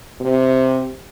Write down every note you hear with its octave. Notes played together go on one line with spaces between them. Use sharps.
C3